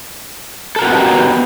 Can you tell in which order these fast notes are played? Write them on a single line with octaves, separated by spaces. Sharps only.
A4 A#4 F#4 G4 B3